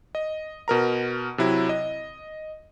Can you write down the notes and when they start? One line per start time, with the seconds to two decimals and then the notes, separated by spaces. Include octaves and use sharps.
0.15 D#5
0.68 B2 A#4 A#5
1.38 C3 F#3 E4
1.69 D#5